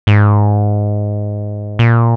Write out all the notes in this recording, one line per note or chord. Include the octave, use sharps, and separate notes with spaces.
G#2
A#2